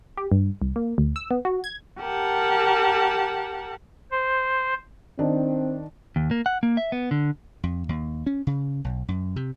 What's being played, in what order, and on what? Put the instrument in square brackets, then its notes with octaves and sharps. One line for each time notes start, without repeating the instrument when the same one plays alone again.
[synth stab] G4
G2
C2
A#3
D2
E6
B3
F#4
G#6
[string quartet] G4 A#4 F#5 A5
[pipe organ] C5
[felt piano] D#3 D4 [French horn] C4
[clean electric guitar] D#2
A#3
F#5
A#3
E5
B3
D3
[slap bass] F2
D#2
C#4
C#3
B1
F#2
C3